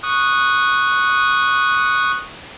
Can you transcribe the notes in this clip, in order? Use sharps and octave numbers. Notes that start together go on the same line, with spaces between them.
C#6 D#6 F#6